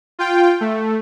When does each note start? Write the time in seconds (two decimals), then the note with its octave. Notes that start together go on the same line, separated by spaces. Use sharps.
0.19 F4 G5
0.61 A3